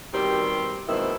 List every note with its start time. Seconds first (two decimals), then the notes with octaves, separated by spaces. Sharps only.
0.13 B2 D#3 G3 C4 G4
0.87 G#2 B2 D#3 A#3 C4 E4